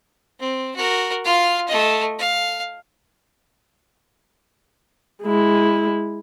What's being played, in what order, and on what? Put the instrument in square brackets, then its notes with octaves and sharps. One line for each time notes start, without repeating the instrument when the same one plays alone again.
[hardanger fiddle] C4
F#4 A#4
F4 F5
A3 D#5
F5
[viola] G#3 E4